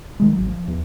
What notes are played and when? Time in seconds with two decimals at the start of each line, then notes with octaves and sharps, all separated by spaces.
0.20 D#3 G#3
0.33 G#1 F#3
0.47 F3
0.68 E2